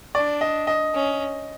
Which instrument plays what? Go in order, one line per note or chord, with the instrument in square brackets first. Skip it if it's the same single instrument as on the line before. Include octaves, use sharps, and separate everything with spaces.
[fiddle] D4 [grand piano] D5
[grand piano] D#5
D#5
[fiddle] C#4